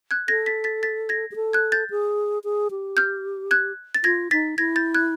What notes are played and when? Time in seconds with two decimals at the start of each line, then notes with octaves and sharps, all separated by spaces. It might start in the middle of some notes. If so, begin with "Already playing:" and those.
0.11 F#6 G#6
0.28 A4 G#6 A#6
0.46 A6 B6
0.64 A6 B6
0.83 A6 B6
1.09 G#6 A#6
1.32 G#4
1.36 A4
1.53 F#6 G#6
1.72 G6 A6
1.90 G#4
2.44 G#4
2.71 G4
2.97 F6 G6
3.51 F#6 G#6
3.95 A6
4.04 F4 G#6 A#6
4.31 D#4 A6 B6
4.58 E4 G#6 A#6
4.76 G6 A6
4.95 F#6 G#6